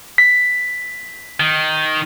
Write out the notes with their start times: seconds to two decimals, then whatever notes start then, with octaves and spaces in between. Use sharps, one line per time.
0.18 B6
1.40 D#3